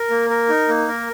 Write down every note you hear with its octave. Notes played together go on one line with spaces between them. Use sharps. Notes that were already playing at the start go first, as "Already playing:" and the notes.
Already playing: A#4
A#3
A#4
D#4
A#3
A#4